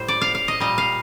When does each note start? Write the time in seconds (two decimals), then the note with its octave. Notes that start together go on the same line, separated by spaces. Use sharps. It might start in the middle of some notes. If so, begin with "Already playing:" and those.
Already playing: A2 G3 C5
0.08 D5
0.21 F5
0.35 F5
0.48 D#5
0.60 A#2 G3 D#5
0.78 F5